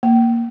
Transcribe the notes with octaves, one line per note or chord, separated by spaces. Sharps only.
A#3